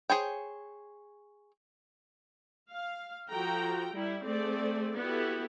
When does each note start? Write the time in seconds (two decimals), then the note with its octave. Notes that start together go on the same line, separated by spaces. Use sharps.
0.10 G#4 C5 C#5 G5
2.71 F5
3.29 F3 F#4 A4 G5 A#5
3.94 G3 E4
4.23 A3 C4 G#4 D5
4.98 B3 E4 F#4 G4 A4